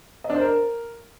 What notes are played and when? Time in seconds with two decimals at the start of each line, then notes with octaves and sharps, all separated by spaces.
0.24 D#5
0.30 D4
0.35 C5
0.40 A#4